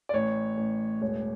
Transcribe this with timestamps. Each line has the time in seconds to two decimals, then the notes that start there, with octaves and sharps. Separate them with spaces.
0.09 D5
0.13 A1 C#5
0.57 A1
1.02 E1 C#5